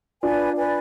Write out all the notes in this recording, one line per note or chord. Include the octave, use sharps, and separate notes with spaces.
D4 F4 B4 D5 G#5 B5
B4 D5 G#5 B5